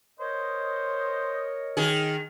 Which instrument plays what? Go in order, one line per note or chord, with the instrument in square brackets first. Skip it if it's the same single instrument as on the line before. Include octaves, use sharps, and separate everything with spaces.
[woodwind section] A#4 C#5 D#5 [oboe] C5
[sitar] D#3 G#4